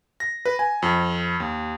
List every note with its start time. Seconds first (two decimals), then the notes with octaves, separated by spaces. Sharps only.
0.20 A#6
0.45 B4
0.59 G#5
0.82 F2
1.40 D#2